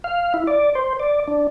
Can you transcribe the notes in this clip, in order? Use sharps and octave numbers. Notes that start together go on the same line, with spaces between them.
F5
E4
D5
C5
D5
D4